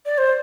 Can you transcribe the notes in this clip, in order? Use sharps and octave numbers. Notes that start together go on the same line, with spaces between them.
D5
C5